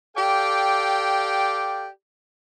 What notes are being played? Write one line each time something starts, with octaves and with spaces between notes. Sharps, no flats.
G4 A4 D5 F5 G5